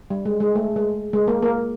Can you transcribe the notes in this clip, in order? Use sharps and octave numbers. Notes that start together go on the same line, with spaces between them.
G3
G#3
G#3
A3
G#3
G#3
A#3
A#3